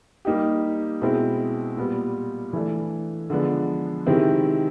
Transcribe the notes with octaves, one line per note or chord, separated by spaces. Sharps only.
G3 A#3 D#4 G4
B2 G#3 C4 E4
A#2 G3 B3
E3 A3 D4
D3 F3 G#3 B3 D4
C3 D#3 G#3 C4 E4